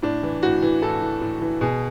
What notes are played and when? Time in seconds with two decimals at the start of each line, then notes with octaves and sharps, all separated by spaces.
0.02 A2 D4
0.23 E3
0.42 A2 F#4
0.62 E3
0.82 A2 A4
1.02 E3
1.21 A2
1.41 E3
1.61 B2 G#4